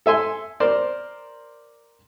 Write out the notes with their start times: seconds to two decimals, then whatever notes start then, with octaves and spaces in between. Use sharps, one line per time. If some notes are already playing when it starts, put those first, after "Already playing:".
0.06 A4 E5 G#5 C6
0.60 A#4 C5 D5